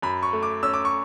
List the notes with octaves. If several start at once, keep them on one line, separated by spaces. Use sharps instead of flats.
F#2 B5
C#6
A3
D6
C#4 E6
D6
C#6